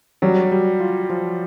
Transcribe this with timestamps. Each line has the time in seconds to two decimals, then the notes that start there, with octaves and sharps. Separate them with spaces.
0.22 F#3 G3
0.52 G3
0.80 F4
1.10 F3